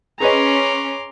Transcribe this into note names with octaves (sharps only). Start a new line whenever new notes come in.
C#4 G#4 B4 D#5 A#5 C6 D6